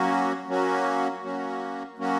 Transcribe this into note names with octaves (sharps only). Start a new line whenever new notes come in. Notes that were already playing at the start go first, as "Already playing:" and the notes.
Already playing: F#3 A#3 C#4 F#4
F#3 A#3 C#4 F#4
F#3 A#3 C#4 F#4
F#3 A#3 C#4 F#4